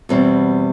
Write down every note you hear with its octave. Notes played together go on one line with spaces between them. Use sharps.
E2 B2 G3 C4